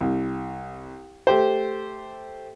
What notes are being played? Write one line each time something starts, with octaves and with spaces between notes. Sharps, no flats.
C2
A3 G4 C5